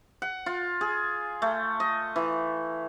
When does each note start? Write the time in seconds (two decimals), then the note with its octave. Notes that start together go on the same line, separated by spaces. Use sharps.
0.22 F#5
0.46 F4
0.81 G#4
1.42 A3
1.80 D#5
2.16 E3